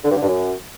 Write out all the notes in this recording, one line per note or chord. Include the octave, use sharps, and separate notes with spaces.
D3
G2
D3
G2
F#2